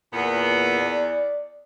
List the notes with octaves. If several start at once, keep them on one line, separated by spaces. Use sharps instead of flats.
E2 A#2 B3
D5